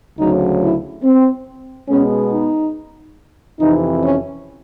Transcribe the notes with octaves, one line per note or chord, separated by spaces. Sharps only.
D2 C#3 F#3 D#4
E4
C4
B2 G#3 B3 C#4
D#4
F2 C3 E3 D#4
C#4